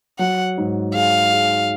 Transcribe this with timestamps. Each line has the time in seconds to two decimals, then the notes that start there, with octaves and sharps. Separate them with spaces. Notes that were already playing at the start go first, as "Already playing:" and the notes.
0.19 F#3 F#5
0.58 G#2
0.95 G#4 F5
1.33 G#4